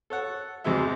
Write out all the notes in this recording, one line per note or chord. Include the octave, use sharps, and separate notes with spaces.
A4 C#5 F#5
G#1 E2 C3 F#3 G#3 E5